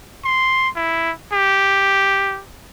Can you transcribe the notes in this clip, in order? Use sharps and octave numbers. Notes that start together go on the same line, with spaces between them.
C6
E4
G4